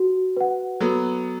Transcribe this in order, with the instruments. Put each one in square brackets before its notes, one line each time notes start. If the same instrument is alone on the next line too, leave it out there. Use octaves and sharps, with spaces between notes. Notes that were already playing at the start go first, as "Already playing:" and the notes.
Already playing: [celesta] F#4
B4 F#5
[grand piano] F#3 B3 [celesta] A4